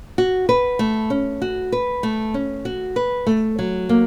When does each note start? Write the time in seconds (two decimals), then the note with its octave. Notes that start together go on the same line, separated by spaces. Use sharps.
0.18 F#4
0.49 B4
0.79 A3
1.10 C#4
1.42 F#4
1.72 B4
2.03 A3
2.34 C#4
2.65 F#4
2.96 B4
3.27 A3
3.59 F#3
3.89 A#3